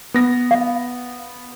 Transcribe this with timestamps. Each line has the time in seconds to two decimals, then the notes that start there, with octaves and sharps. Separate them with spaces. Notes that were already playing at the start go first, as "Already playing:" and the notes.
0.14 B3 A#6
0.51 F5